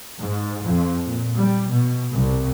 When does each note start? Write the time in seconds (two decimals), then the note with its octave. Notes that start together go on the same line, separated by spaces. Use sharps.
0.17 G#2
0.65 F2
1.06 A#2
1.38 G3
1.72 B2
2.14 C2